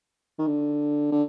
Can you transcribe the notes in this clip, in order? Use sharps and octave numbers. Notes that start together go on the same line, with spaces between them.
D#3
D3
D3